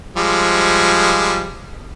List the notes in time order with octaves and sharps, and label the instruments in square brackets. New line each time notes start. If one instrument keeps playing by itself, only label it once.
[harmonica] F3 G3 G#3